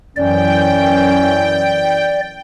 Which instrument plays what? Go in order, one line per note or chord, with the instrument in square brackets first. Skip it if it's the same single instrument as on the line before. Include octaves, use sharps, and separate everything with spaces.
[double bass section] F#2 E3 [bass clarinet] C#4 [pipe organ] D5 [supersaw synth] G5